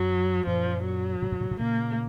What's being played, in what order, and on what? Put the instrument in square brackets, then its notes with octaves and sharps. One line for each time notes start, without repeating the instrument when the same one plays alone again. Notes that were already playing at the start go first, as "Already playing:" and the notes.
Already playing: [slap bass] F#2 [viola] F#3
[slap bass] F#2 A#2 [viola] F3
[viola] F#3
[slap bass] A2 C3
F#2 A#2
A2 C3
A2 C3
[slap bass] A#2 C#3 [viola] A#3